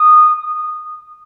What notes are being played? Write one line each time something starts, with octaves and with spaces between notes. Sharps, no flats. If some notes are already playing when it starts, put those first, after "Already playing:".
Already playing: D#6